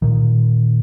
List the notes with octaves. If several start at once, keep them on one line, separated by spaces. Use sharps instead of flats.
A#2 D#3